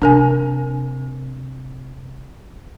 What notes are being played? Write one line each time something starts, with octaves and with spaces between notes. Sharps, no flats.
C3 D4 A#4 G#5